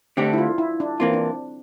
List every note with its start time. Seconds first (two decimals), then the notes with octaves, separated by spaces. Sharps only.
0.17 D3 A3 C4 D4 G4
0.33 E4
0.38 F4
0.58 E4
0.80 D4
1.00 E3 A#3 C4 F4
1.13 D4